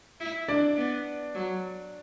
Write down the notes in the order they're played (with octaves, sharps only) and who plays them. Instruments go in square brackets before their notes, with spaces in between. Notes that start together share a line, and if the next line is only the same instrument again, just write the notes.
[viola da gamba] E4
[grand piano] D4 D5
[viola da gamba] B3
F#3